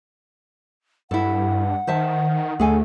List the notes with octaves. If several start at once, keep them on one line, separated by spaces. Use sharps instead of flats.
G2 E4 A4 F#5
D#3 C5 E5 A5
D2 A3 G#4 A4 G#5